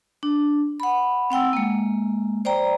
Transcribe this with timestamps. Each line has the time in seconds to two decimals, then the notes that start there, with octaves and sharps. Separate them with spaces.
0.23 D4
0.80 F#5 B5
1.30 C4 F#5 G5 E6
1.53 G#3 A#3
2.45 C5 D5 G5 A#5